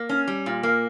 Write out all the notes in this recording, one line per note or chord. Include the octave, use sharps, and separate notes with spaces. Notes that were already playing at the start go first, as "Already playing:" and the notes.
Already playing: A#3
C#4
G3
A#2
A#3